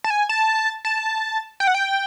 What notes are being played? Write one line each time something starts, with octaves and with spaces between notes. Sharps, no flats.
A5
G#5
A5
A5
G5
F#5
G5